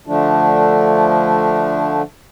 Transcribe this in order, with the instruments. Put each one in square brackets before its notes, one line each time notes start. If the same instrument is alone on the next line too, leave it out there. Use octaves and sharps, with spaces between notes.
[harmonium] D3 F3 A3 D4